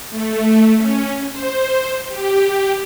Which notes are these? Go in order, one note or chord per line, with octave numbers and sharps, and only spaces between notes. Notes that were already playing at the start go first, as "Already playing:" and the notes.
A3
C#4
C5
G4